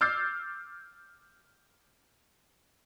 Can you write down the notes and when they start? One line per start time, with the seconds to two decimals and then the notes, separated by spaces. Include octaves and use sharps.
0.01 D6 E6 F6 G6 A6 C7